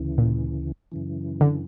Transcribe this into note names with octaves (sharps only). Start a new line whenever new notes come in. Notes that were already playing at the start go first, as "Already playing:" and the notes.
Already playing: D2 C#3 E3
A#2
F#2 C#3 E3
D3